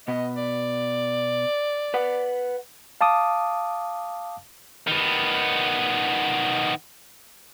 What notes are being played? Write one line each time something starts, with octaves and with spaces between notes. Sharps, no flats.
B2 B3 D#5
D5
B4 F#5
F5 A5 D6 D#6
D#3 B3